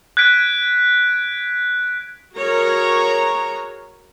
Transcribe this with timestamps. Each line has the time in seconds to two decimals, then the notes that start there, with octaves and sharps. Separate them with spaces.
0.17 F#6 G#6 B6 D7
2.36 F#4 G#4 A#4 C#5 A#5